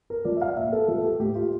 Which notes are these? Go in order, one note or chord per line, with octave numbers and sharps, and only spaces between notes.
A#4
F3 D5
E5
F5
A#2 E5
A4
F3 A4
G4
A2 G4
F4